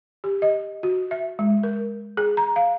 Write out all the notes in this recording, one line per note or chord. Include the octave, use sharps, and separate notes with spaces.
G4
D#5
F#4
E5
G#3
A#4
G#4
A#5
F5